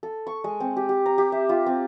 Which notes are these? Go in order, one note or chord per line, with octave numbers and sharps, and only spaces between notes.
A4
C#6
G#3
C4
G4
G4
A#5
G4
E5
F4
C4